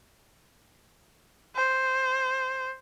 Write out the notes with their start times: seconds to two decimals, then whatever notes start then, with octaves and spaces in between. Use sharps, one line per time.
1.56 C5